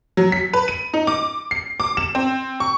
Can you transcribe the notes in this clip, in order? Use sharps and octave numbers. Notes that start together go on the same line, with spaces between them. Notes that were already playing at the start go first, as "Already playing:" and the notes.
F#3
B6
B4
D#7
D#4
D6
C7
D6
E7
C4
C#6